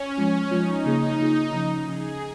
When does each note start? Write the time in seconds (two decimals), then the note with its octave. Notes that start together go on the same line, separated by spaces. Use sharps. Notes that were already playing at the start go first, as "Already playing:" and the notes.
Already playing: C#4
0.17 F3 G#3 F4
0.51 F3 G#3 D#4 F4
0.85 C#3 A#3 F4 G#4
1.19 C#3 A#3 F4 G#4
1.53 C#3 F3 C#4
1.87 C#3 F3 C#4 G#4